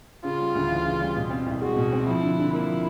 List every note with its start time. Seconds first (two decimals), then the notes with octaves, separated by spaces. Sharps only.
0.24 C#3 F4
0.39 G3
0.55 D2
0.70 E3
0.85 C#3
1.00 G3
1.16 B2
1.30 C4
1.46 C2
1.61 G#3 F#4
1.76 B2
1.92 C4
2.07 F3 E4
2.23 D3
2.38 D3
2.53 A#3 E4
2.68 F3